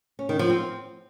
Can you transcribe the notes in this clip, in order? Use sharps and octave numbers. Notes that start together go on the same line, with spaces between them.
C#4
D#3
F3
C4